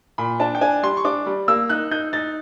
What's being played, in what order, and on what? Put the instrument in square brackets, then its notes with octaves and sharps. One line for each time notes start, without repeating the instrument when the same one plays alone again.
[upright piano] A#2 B5
D4 A5
G5
D4 G#5
G3 C6
C#6
D4 D6
G3
A#3 E6
D#4 F#6
D#4 G6
D#4 A6